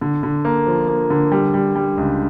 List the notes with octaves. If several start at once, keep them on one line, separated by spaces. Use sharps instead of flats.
D3
D3
A#3
F3
A#3
D3
G3
G3
G3
C#2